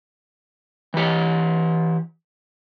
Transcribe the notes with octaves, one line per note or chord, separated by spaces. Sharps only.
E3 G4